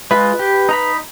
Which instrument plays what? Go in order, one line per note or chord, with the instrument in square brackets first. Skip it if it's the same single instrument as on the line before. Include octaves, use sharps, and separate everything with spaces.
[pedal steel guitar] G#3 F4 [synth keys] B4
[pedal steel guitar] G4
D#4 A#5 B5